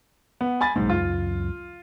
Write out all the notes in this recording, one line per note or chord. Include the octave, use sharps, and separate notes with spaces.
B3
G#5 B5 A6
B1 G#2 F#3 A#3
C#2 F#2 F4